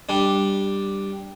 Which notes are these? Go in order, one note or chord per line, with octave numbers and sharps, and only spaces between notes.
G3 D4